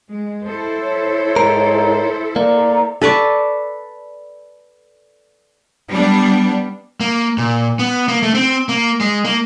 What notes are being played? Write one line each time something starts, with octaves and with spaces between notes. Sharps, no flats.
G#3
E4 A4 C5
C#5
G#2 A#4
A#3 D5 A#5
A4 B4 D5 C#6
G3 B3 D4
A#3
A#2
B3
A#3
A3
C4
A#3
G#3
A#3